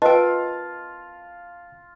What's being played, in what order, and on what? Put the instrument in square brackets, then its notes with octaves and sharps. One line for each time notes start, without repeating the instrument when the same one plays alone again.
[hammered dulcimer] F4 [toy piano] A#4 D#5 [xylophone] B4 G5 [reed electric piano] A5